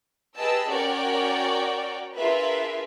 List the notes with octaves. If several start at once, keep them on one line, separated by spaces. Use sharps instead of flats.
G4 G#4 B4 D#5 A5 E6
C#4 F#4 A#4 C#5 D5 G5
D4 F4 G#4 A#4 B4 E5